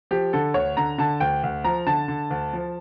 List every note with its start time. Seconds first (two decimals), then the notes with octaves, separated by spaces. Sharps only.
0.11 F3 G4
0.33 D3 A4
0.54 D2 C#5
0.77 D3 A#5
0.98 D3 A5
1.20 D2 G5
1.43 D2
1.64 F3 A#5
1.87 D3 A5
2.08 D3
2.31 D2
2.53 F3